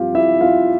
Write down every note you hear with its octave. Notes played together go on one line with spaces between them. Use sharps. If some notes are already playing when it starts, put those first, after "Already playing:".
Already playing: G2 F3 C4 F4 G4 F5
E4 E5
F4 F5